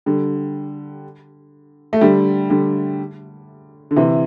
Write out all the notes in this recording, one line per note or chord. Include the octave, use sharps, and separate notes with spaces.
D3 G3
A3
D3 G3
D3 G3
D3
C3 E3